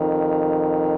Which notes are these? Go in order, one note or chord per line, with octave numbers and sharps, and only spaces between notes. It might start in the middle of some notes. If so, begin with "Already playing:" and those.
Already playing: F2 D#3